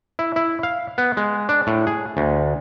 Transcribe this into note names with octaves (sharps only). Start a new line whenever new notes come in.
E4
E4
F5
B3
G#3
D4
A2
G#4
D2